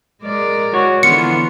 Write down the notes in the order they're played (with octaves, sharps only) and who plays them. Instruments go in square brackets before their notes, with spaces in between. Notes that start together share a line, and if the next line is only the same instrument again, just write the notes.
[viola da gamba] G#3 A#4 D5
[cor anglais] F#4 [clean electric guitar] C#5
[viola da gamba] D3 E3 D4 [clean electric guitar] B3 [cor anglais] F4 [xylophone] C#7